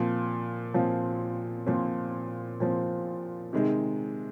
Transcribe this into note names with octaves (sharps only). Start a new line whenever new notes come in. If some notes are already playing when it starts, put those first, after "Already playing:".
Already playing: A#2 F3 C4
A#2 F3 C4
A#2 F3 C4
A#2 F3 C4
C3 D#3 G#3